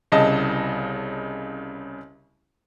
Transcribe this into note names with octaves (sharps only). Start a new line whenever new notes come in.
C2 C#3 D#5 A5